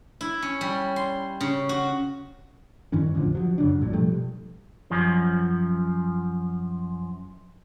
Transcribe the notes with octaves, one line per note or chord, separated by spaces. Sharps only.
E4
C#4
G3
C6
C#3
F#4
G2 D#3 E3 C#4
A1 E2 D3 F3
F3 F#3
F#2 C#3 F#3 D4
A#1 G2 A#2
B2 F3 G3 A3
F#2 F3